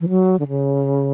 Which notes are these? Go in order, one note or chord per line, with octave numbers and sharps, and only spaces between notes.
E3
F#3
D3
C#3